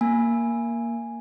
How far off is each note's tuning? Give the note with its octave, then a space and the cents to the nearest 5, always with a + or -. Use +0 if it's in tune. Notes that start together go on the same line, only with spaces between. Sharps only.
A#3 +0 G#5 +0